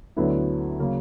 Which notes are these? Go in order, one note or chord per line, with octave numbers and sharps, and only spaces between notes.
D2 D3 F#3 B3 E4
C#3 F#3 A#3